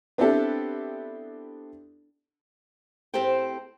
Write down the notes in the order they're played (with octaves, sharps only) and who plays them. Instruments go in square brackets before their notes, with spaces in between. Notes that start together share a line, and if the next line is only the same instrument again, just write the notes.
[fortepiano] B3 C4 D4 E4 G4 A4
[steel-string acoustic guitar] A2 C4 G4 A4 C5 G5